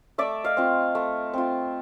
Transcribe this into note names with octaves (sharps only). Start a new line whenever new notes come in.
A3 D5 E5
D#5 F5
C4 F4
A3
C4 F4